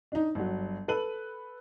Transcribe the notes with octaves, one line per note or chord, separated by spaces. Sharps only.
D4 D#4
G1 F#3
A4 B4 D#7 F#7